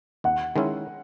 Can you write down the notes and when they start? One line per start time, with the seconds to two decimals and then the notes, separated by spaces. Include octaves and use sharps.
0.24 D#2 F#5
0.56 D#3 G#3 C#4 E4